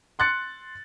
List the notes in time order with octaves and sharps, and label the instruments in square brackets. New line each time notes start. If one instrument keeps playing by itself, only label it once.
[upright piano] C6 F#6 A6 C#7